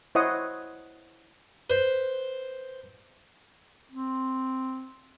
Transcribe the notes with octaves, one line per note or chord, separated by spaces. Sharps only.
E4 C5 C#5 D#5 F#5 D#6
B4 C5
C4